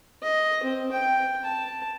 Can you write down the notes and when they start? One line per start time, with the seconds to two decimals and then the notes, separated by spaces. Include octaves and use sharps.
0.23 D#5
0.63 C4
0.92 G5
1.45 A5